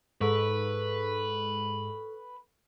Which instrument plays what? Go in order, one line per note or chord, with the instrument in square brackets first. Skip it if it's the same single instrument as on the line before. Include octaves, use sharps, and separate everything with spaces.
[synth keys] G#2 [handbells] A4 C#6 [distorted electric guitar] B4